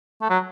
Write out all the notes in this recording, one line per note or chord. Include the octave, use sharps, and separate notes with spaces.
A3
F#3